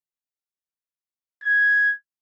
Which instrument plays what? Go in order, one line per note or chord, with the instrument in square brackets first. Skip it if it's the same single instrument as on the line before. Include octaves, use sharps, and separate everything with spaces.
[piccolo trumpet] G#6